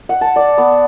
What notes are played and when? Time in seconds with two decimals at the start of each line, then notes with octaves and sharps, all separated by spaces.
0.09 F#5
0.21 A5
0.36 D5
0.58 B3